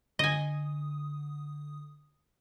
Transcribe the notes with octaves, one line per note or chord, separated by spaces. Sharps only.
D3 D#5 G#5 D#6